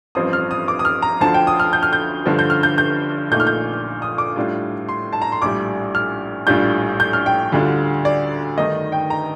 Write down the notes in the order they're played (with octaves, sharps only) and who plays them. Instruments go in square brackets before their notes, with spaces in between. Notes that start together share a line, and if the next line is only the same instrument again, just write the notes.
[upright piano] A1 G2 F3 C4 D#6
F6
D#6
D6
D#6
F6
A#5
D2 D3 F3 A5
G5
D#6
F6
G6
F6
G6
G2 D3 F3
G6
F6
G6
G6
A#1 A#2 A3 D#4 G6
F6
G6
D#6
D6
A2 G3 D4 F4
C6
A5
A#5
C6
A#1 A2 G3 D6
F6
A#1 A2 G3 D4 F4 G6
G6
F6
G5
D2 D3 G3 D4 F4
D5
G2 D#3 A3 D#4 D#5
G5
A#5